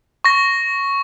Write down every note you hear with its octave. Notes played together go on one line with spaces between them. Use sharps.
C#6 A#6